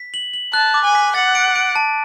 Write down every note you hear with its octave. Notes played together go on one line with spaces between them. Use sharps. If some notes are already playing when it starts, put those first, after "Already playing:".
Already playing: B6
F#7
F#7
A5 F#6
D6
G#5
B6
F#5 A6
D7
D7
A5